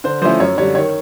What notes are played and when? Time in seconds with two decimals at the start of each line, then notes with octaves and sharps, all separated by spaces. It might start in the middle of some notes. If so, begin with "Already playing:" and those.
0.04 D3 C5
0.21 F3 A3 C#4 E4 C5
0.40 F#2 C#5
0.58 D3 G3 C#5
0.75 D#3 C#5